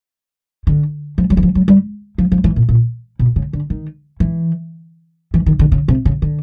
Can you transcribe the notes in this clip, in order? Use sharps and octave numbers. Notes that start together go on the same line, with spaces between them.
D3
F3
F#3
E3
F3
F#3
G3
F3
F3
E3
A#2
A#2
B2
C#3
D3
D#3
E3
E3
D#3
D3
C#3
C3
C#3
D3